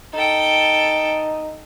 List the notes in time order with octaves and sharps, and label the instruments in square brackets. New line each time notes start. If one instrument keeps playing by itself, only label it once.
[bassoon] D#4 [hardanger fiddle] A4 G5